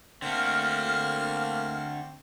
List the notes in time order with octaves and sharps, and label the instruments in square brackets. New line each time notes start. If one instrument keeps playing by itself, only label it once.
[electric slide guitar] D3 A3 [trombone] A#3 [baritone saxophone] C4 [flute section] F6